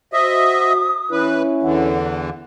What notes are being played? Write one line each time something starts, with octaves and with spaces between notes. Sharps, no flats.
F#4 C5 D#5 E5 D#6
E3 C#4 E4 B4
E2 D3 E3 F#5